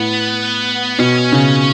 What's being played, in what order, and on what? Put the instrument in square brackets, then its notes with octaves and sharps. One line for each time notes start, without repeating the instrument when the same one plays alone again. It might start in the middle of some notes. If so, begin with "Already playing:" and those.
Already playing: [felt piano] A2 [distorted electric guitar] B3
[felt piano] B2 [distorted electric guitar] C#4
[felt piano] C#3